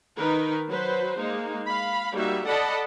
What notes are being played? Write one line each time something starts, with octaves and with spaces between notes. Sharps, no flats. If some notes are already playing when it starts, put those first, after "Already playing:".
D#3 D#4 A#4 B4
F#3 B4 C5
G#3 A#3 D#4
F5 B5
G3 A#3 D#4 F#4 E5
A4 D5 D#5 F#5 A5 B5